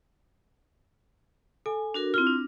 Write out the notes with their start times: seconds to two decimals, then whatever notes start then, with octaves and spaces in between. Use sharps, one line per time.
1.66 A4 G#5
1.94 D4 F#4 A#4
2.14 C4 E4 F4 F6
2.27 D4